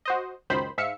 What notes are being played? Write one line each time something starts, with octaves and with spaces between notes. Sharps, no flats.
F#4 C5 D#5
C#2 F#2 D#3 C5 B5
G#2 E5 F5 C#7